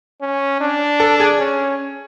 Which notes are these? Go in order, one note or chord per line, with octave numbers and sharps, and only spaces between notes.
C#4
D4
A4
G#4
C#4